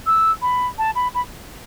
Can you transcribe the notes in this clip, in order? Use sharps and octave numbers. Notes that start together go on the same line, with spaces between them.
E6
B5
A5
B5
B5